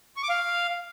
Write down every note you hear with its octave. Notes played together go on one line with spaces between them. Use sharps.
C#6
D6
F5